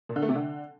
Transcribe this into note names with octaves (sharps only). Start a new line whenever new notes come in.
A#2
D3
A3
C3
D3